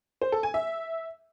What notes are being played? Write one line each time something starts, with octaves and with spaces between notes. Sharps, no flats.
C5
A4
G#5
E5